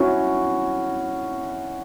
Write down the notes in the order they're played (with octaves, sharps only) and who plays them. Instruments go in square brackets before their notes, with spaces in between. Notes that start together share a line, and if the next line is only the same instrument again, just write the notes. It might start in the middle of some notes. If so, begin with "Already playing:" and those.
Already playing: [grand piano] C#4 E4 F#4